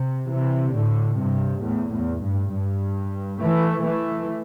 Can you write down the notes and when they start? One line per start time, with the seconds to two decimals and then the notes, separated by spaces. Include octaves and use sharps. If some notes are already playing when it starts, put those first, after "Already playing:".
Already playing: C3
0.29 C3 E3
0.73 A2 D3
1.18 G2 C3
1.63 E2 A2
1.93 E2
2.23 G2
2.52 G2
3.41 E3 A3
3.85 E3 A3